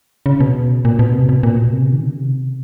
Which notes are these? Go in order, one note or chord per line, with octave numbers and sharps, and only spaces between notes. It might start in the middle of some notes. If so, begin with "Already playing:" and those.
C#3
B2
A#2
B2
C3
B2
A#2
B2
C3
C#3
D#3
C#3
C3